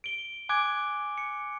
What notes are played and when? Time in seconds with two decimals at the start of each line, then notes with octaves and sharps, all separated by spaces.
0.04 D7 G7
0.49 G#5 D6 F#6 G#6 D7
1.18 C#7